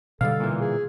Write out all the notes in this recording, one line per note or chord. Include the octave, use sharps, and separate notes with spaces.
B2 D3 G3 A4 F5
A#2 E3
G#4